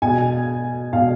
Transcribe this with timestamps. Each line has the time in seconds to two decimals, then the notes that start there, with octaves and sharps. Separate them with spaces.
0.02 B2 G#5
0.93 B2 F5